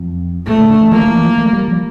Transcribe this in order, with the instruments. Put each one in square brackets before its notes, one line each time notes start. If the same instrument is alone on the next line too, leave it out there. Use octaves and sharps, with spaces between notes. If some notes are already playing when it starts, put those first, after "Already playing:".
Already playing: [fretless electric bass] F2
[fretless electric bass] A#2 [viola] A3
[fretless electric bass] D3
D3
E3
[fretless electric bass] F3 [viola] A#3
[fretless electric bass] F3
E3
F3
A3
G3
F3